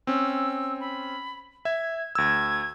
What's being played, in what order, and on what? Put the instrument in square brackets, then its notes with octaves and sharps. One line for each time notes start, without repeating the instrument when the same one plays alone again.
[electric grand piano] C4 C#4 [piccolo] E6
[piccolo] B5
[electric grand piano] E5 [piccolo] G#6
[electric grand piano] D2 E6 [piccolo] G#6